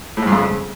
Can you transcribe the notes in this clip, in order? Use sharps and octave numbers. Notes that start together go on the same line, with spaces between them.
A2
G#2
G2
F2
C#3